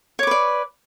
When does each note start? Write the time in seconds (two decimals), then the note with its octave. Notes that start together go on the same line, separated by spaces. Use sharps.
0.19 C#5
0.23 D6
0.27 B4
0.31 D5